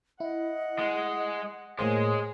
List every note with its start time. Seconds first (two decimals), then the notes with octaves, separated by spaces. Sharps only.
0.20 E4 D#5 F#5
0.79 G#3
1.79 A2 G#3 A#3 G#4 C5 C#5